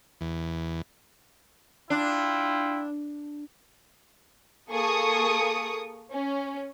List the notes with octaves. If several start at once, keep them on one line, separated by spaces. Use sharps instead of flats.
E2
D4 E4 F4 G5
A#3 G#4 A4 C#6 D#6
C#4